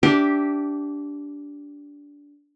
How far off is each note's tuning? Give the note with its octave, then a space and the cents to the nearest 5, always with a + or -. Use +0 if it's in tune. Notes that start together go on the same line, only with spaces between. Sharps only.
D4 -20 G4 -5 E5 -15